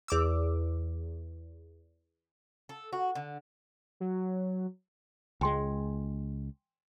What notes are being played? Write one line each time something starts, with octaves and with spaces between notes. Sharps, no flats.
E2 D6 E6
A4
F#4
D3
F#3
C#2 G#3 G5 G#5 C6